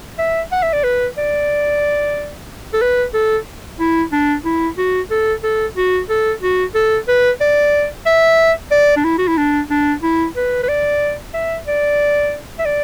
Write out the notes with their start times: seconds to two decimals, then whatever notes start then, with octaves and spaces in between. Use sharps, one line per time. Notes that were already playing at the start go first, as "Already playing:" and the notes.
0.19 E5
0.52 F#5
0.63 E5
0.73 D5
0.84 B4
1.18 D5
2.74 A4
2.81 B4
3.14 A4
3.80 E4
4.12 D4
4.45 E4
4.78 F#4
5.11 A4
5.43 A4
5.77 F#4
6.09 A4
6.42 F#4
6.75 A4
7.08 B4
7.41 D5
8.06 E5
8.71 D5
8.97 D4
9.04 E4
9.19 F#4
9.28 E4
9.38 D4
9.70 D4
10.03 E4
10.36 B4
10.63 B4
10.69 D5
11.34 E5
11.67 D5
12.59 E5
12.66 D5